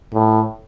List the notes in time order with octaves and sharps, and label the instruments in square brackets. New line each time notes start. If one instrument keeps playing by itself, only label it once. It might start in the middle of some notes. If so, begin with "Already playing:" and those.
[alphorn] A2